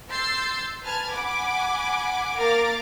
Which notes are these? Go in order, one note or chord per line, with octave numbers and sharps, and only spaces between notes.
C6 E6 G6 A6 C7
B4 G#5 A5 F6 G#6
F#5 G#5 B5 D6
A#3 A#4 F5 A#5 D6 A6